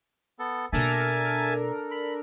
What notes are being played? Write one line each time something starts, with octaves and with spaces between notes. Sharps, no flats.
B3 A4
B2 A#3 D4 A4 A#4 E5 G#5 A5
B5